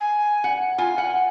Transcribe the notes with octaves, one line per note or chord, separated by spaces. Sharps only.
G#5
F#5
F4 G#5
F#5